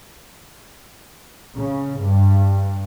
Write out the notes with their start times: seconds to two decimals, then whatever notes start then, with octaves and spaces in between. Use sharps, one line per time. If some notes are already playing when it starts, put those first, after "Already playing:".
1.56 C#3
2.01 G2